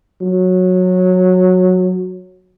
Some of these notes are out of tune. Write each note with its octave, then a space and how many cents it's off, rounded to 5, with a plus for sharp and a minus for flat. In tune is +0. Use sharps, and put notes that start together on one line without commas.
F#3 -15